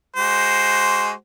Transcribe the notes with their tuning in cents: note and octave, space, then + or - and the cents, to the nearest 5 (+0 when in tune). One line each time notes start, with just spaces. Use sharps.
G#3 +0 F#4 +30 C5 +0